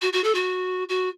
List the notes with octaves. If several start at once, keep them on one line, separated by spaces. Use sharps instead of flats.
F#4
F#4
A4
F#4
F#4